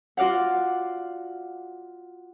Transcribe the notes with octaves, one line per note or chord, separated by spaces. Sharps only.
F4 F#4 D5 F5 F#5